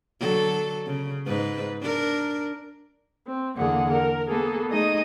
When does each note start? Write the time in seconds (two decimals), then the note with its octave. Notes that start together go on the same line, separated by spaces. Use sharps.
0.20 D3 F#3 A4
0.86 C#3
1.26 G#2 B4
1.81 D4 A#4
3.26 C4
3.57 E2 D3 A#3 G#4 F#5
3.91 A#4
4.29 A#3 B3 G#4 A4
4.69 A3 D#4 G#4 D#5 D#6